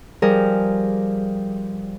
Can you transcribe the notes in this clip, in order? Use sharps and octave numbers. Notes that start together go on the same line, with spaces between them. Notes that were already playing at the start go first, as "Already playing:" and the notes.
F3 G3 G#4 A#4